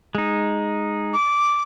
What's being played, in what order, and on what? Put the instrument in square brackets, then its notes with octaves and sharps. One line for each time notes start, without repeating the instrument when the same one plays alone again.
[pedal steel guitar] G#3 D#4
[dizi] D6